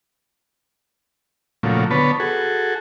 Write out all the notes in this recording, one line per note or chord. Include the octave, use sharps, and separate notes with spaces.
A#2 C#3 F3 F#3 A3
D3 B3 B4 C#5 A5
F#4 G#4 A4